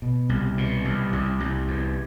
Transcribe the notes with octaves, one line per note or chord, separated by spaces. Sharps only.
B2
C2
B2
C2
C2
C2
E2